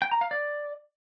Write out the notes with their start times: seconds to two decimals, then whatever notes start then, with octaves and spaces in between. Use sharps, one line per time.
0.02 G5
0.11 A#5
0.21 F5
0.31 D5